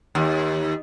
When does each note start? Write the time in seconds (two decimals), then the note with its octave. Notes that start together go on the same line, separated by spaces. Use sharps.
0.15 D#2